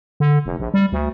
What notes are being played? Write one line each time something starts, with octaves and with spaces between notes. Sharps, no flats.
D3
F1
A#1
G3
D2